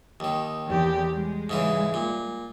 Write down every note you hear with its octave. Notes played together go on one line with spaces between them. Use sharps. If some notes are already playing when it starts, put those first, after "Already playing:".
D#2 D#3
E2 G4
G3 G#3
G#2 C#3 E3
A#2